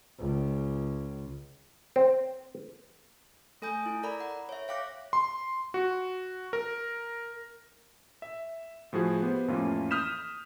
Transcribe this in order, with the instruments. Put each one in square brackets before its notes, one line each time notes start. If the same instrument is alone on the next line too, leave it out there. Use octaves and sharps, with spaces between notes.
[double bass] C#2
[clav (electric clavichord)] C4
[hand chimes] A3 A4 G#5 D#6 G6
E4
A4 A#4 D5 A#5 B5
F#5
C#5 E5
C#5 F5 G5 D6 F#6 A#6
[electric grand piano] C6
F#4
A#4
E5
A2 F3 F#4 G#4
B3 G4 C5
F2 A2 E3 A#3 C#4 F4
D#6 F6 G6 B6 E7